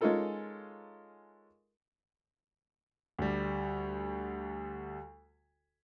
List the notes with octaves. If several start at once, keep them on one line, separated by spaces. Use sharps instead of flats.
G#3 C#4 D#4 F4 A4 A#4
D2 G3